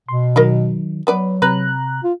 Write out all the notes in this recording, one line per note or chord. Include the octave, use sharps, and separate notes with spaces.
B2 C6
D#3 F#3 A#4 D#5 B5
F#3 B3 B4 D5
C3 B4 A#5 F#6
F4